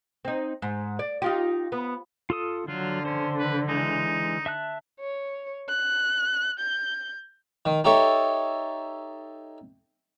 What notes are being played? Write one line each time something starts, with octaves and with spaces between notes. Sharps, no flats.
C4 D#4
G#2
D5
D#4 F4 G4
B3
F4 A4 D#6
D3 F#3 F4
C#4 C5
B4
E3 G#3 D#4
E5 A5 F#6
C#5
F#6
G6
D#3
D#4 G4 A4 C#5 E5